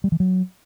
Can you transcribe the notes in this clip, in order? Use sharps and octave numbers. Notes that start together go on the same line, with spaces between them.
G3
E3
F#3